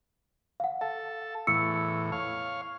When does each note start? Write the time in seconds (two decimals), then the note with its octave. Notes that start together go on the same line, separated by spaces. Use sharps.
0.60 F5 F#5
0.81 A4 F5
1.47 E2 A2 C#6 E6 C#7
2.12 C#5 F5